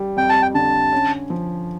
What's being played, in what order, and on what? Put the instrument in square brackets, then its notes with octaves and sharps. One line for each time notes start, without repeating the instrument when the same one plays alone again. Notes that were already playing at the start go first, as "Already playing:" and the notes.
Already playing: [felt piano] G3
[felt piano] F2 [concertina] G5
[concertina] A5
G5
[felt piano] D3 [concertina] A5
[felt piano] C#4
F3